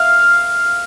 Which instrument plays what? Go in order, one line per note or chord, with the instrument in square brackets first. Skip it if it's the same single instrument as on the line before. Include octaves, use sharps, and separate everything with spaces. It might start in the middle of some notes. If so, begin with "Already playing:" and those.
Already playing: [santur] F5